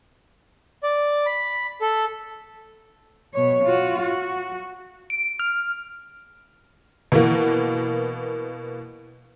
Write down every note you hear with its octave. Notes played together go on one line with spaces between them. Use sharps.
D5
B5
A4
B2 C#5
F4 F#4
F#4
D7
F6
B2 E3 A#3